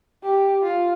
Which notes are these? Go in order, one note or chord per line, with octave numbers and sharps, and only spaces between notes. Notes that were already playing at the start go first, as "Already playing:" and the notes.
G4
F4